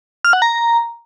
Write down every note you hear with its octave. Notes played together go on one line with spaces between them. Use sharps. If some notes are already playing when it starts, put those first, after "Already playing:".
F6
F#5
A#5